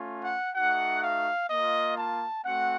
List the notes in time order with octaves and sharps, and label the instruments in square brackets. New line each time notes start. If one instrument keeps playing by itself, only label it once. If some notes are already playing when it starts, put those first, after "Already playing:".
Already playing: [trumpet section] A3 C#4 F4
F#5
A3 D#4 F#4 F#5
F5
A#3 F4 D#5
A5
A3 C4 F#4 F#5